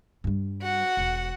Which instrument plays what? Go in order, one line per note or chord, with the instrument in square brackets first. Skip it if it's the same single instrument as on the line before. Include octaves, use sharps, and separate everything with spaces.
[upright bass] G2 G3
[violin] F#4 F#5
[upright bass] E1